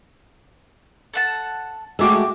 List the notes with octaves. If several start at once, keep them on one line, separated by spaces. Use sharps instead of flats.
A4 F#5 A5
G#3 A3 F#4 G5 D6 E6